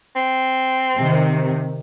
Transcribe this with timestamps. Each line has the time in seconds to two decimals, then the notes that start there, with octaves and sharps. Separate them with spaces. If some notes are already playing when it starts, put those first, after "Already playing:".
0.16 C4
0.98 C3 D#3